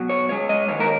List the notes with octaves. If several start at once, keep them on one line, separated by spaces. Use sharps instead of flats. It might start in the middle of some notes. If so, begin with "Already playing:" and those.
Already playing: B2 F#3
C#5
C#2 C#3 G#3 C#5
D#5
D#2 D#3 G#3 C#5
A#4